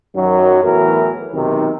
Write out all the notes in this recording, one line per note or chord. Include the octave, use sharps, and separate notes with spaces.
F#2 D#3 F#3
E2 A2 E3 F#3 A#4
B1 C3 D#3